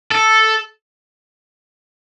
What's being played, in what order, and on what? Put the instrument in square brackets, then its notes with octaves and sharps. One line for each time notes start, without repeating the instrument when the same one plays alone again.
[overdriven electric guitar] A4